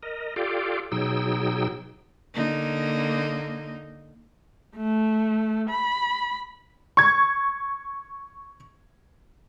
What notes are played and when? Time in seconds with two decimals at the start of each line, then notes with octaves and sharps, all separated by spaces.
0.03 A#4 D#5
0.36 F4 G4 A4 D5 F5 G5
0.92 B2 F#3 D#4 G#4 G5 E6
2.34 D3 A#3 D#4
4.76 A3
5.70 B5
6.97 C#6 G#6